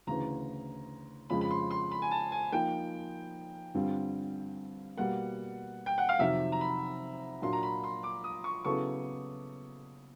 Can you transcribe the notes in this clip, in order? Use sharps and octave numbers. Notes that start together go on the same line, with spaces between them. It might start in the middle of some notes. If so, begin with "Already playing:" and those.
D2 C#3 E3 A#5
F2 C#3 F3 G#3 B5
B5
C6
C6
B5
G#5
A5
G#5
F3 A#3 D#4 G5
G2 D3 G3 C4 F4
B2 G3 A#3 F#5
G5
F#5
F5
F2 C3 D#3 F#3 E5
A#5
B5
A#2 F#3 A#3 D4 F4 C6
A#5
B5
C6
D6
D#6
C#6
C#3 F#3 B3 E4 A4 C#6